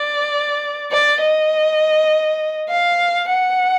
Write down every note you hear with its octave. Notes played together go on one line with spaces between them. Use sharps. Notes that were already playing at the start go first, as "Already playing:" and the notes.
Already playing: D5
D5
D#5
F5
F#5